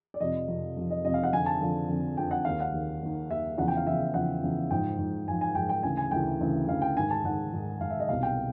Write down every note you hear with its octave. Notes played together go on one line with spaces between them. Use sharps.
D5
F2 C3 F3 D#5
F2 C3 F3
F2 C3 F3
D#5
F2 C3 F3 D#5
F5
F#5
F2 D3 F3 G#5
A5
F2 D3 F3
F2 D3 F3
F2 D3 F3 G5
F#5
D#2 D#3 F5
F#5
D#2 D#3
D#2 D#3
D#2 D#3 E5
E2 C#3 F3 F#5
G5
F5
E2 C#3 F3 E5
E2 C#3 F3 F#5
E2 C#3 F3
G#2 F3 G5
G#2 F3
G#2 F3 G#5
G#5
G#2 F3 G5
G5
D2 C#3 E3 G#5
G#5
D2 C#3 E3 G5
D2 C#3 E3
D2 C#3 E3 F5
G5
G#2 D#3 G#5
A5
G#2 D#3 F#5
G#2 D#3
G#2 D#3 F5
E5
D#5
C2 B2 F5
G5